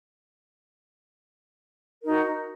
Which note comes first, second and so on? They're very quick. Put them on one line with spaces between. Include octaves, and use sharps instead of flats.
A#4 D#4 F#4